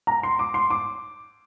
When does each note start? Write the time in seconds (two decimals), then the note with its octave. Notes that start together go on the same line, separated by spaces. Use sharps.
0.07 A#5
0.23 C6
0.39 D6
0.54 C6
0.70 D6